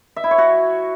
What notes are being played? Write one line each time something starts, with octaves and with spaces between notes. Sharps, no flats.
E5
E4
C#5
F#4